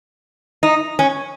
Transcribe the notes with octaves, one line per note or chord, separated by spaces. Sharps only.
D#4
C#4